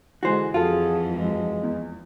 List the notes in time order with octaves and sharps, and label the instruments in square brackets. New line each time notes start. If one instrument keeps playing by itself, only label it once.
[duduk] D3 [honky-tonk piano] E3 G#3 [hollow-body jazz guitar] F#4 C5
[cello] F2 E3 [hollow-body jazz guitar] F4 [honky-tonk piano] F#4 A4 [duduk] G#4
[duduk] G#3
[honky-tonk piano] E2